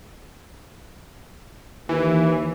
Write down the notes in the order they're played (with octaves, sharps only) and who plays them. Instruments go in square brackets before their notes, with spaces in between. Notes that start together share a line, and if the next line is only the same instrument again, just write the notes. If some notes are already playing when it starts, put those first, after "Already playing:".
[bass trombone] D#2 [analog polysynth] E3